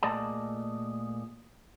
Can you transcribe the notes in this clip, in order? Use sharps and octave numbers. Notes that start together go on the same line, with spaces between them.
A#2 A3 G#4 D5 D#5 A5